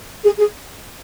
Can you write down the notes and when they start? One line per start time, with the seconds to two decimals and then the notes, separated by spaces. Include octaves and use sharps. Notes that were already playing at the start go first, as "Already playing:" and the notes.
0.24 G#4
0.38 G#4